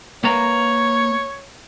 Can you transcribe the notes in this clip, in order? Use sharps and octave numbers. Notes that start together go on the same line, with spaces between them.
A#3 B4 C#5 A#5